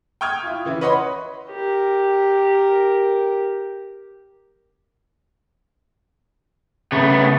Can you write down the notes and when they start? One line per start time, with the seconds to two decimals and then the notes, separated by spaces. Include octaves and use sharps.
0.21 G5 C#6 D#6 F6 G#6
0.43 E4 F4
0.65 C#3 E3 E4
0.81 B4 C#5 D#5 F#5 B5 C6
1.50 G4 A#4
6.92 C#3 A3 B3